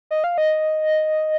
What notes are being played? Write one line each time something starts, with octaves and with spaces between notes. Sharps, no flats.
D#5
F5
D#5